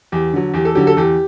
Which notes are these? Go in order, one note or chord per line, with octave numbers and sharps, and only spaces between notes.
E2 G4
D3 F#3
E2 G4
A4
D3 F#3 G4
A4
E2 G4